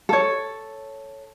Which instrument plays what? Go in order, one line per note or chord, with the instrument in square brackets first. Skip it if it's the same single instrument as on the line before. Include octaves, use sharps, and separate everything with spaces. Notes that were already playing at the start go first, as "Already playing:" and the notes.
[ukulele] A4 C#5